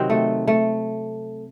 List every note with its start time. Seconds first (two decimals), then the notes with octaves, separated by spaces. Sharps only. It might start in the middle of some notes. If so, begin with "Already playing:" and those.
Already playing: C3 D#3 F#3 C4
0.10 A3
0.47 A3